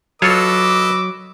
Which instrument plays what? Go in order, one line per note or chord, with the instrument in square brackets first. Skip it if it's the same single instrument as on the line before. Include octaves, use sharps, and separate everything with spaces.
[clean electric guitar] F#3 [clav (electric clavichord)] F4 A4 C#5 [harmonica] B4 D#5 E6 [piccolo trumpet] D6